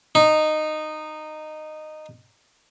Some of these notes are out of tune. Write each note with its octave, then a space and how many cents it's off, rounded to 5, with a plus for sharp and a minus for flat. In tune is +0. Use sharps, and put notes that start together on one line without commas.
D#4 -15